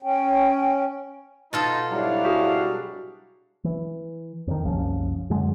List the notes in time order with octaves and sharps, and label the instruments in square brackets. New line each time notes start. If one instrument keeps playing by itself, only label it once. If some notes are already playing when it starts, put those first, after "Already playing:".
[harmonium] C#4 [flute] G5
[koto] B2 F4 A4 [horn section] D#4
[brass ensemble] G#2 E4 F5 [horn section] F#3 G3 D4
[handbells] F#4 G#4
[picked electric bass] E3
F2 D#3
F#1 C2 F3 C#4
F#2 D3 F#3 G#3